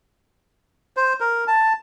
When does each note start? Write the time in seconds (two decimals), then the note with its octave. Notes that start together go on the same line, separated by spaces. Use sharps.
0.97 C5
1.20 A#4
1.47 A5